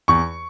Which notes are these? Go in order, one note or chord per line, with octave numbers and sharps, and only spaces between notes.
E2 C#6